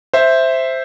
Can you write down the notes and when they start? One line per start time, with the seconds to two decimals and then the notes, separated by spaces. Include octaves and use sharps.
0.14 C5 E5